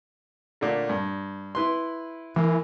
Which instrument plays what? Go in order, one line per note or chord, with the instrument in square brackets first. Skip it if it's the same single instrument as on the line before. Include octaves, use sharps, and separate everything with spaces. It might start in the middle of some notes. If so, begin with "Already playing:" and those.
[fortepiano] A#2 D3 A3
G2
E4 B4 C6
[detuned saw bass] E3 [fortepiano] A#3